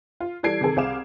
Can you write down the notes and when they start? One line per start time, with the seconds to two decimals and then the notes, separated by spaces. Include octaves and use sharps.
0.20 F4
0.43 E3 G3 A4 G#6 C7 D7
0.61 C3 D#3 G#4 A4
0.76 C2 C4 G#4 F5 D6 E7